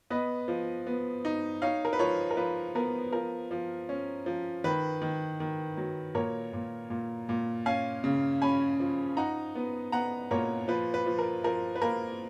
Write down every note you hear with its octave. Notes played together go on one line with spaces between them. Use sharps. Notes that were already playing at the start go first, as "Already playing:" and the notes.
B3 B4 D#5
F3
B3
D#4
D#4 C#5 F5
A#4
B4
F3 A#4 C#5
A#4
F3 B4
B3 A#4
F3 A#4
F3
C#4
F3
D#3 B4
D#3
D#3
F#3
A#2 A#4 C#5
A#2
A#2
A#2
C#4 F5 G#5
C#3
C#4 G#5 B5
F3
D#4 F#5 A#5
B3
B3 F#5 A#5
A#2 A#4 C#5
F3 B4
B4
F3
A#4
F3 A#4
B4
A#3 A#4